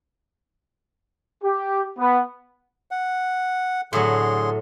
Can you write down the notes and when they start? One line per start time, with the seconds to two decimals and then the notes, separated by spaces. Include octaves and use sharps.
1.43 G4
1.99 B3
2.91 F#5
3.93 A2 D3 F#3 G#4 C6